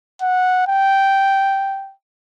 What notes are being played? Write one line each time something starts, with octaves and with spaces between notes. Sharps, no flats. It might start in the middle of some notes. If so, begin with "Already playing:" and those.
F#5
G5